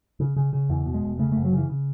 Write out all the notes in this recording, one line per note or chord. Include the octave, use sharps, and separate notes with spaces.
C#3
C#3
C#3
E2 E3
B2
G#3
E1
C#3 A3
F#1 A3
F#3
C#3 E3
C#3